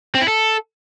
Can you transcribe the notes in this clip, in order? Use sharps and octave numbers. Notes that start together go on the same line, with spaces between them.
C4
E4
A4